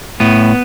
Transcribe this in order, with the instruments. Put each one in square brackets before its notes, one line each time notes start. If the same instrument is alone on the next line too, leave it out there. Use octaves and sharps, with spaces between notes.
[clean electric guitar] A2 B3